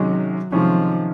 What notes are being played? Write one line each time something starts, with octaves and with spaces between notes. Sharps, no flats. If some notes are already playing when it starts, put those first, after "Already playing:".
Already playing: C3 D#3 F#3 G#3 C#4
C3 D#3 F3 G#3 C#4